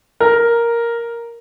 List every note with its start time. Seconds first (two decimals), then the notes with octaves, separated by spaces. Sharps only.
0.20 A#4